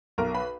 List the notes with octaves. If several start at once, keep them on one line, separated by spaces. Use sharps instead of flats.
B1 A#4 A#5
B4 B5